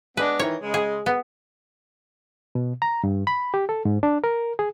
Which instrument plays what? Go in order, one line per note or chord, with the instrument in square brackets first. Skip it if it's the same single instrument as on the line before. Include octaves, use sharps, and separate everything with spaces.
[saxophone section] G#3 B3 D4 [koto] B4
[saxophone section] D#3 E3 [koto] C#5
[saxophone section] C#3 G#3
[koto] G#4
B3
[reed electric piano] B2
A#5
G2
B5
G4
A4
G#2
D4
A#4
G#4